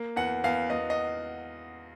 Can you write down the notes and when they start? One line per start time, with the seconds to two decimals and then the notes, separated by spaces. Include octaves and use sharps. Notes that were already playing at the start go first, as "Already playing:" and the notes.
Already playing: A#3
0.16 E2 F#5
0.44 E2 F5
0.70 E2 D#5
0.90 D#5